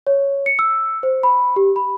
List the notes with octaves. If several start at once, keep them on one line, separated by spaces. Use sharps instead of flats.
C#5
C#7
E6
C5
B5
G4
B5